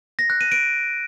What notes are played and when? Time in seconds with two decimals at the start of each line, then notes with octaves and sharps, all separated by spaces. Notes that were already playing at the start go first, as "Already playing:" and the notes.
0.19 A#6
0.30 F#6
0.41 D#7
0.52 D7